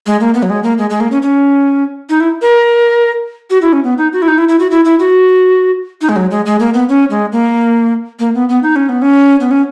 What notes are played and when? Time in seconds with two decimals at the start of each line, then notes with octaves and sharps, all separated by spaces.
0.06 G#3
0.21 A#3
0.34 B3
0.43 F#3
0.50 G#3
0.63 A#3
0.78 G#3
0.90 G#3
1.00 A#3
1.11 C#4
1.22 C#4
2.10 D#4
2.20 E4
2.42 A#4
3.50 F#4
3.62 E4
3.73 C#4
3.84 B3
3.98 D#4
4.13 F#4
4.22 E4
4.28 D#4
4.38 E4
4.49 E4
4.60 F#4
4.71 E4
4.85 E4
5.00 F#4
6.02 D#4
6.09 G#3
6.16 F#3
6.31 G#3
6.46 G#3
6.60 A#3
6.74 B3
6.89 C#4
7.10 G#3
7.32 A#3
8.20 A#3
8.35 B3
8.49 B3
8.63 D#4
8.76 C#4
8.89 B3
9.02 C#4
9.40 B3
9.51 C#4